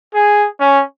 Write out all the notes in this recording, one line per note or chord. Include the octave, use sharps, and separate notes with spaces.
G#4
C#4